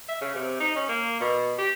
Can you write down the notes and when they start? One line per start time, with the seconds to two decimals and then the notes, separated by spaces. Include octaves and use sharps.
0.09 E5
0.21 C#3
0.35 C3
0.60 D#4
0.76 C#4
0.89 A#3
1.21 B2
1.58 G4